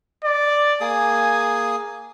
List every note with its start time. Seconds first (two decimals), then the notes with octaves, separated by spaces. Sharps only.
0.24 D5
0.81 A#3 G#4 G#5 D#6